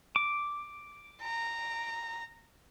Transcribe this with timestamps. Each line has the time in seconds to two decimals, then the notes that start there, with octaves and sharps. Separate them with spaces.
0.16 D6
1.23 A#5